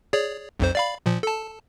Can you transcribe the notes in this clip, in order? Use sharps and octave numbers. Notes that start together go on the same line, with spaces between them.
G#4 C#5 D5
B1 F2 C5
D5 F5 B5
A#2 F3
A4 A5